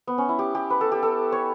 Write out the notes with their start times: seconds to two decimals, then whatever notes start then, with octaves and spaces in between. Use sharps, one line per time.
0.07 B3
0.18 C#4
0.29 E4
0.39 G4
0.55 G4
0.70 B4
0.81 A4
0.92 G4
1.03 A4
1.32 C#5